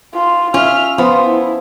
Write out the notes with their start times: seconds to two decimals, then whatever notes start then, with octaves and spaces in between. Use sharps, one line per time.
0.15 F4
0.54 C#4 F4 E5 F6
0.98 F3 B3 F4 C5
1.28 E4